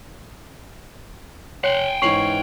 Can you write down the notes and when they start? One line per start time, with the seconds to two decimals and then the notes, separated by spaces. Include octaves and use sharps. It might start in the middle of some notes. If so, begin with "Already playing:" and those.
1.64 C#5 F#5 G5 C6
2.02 G#2 E3 C#4 C#6 C7 F#7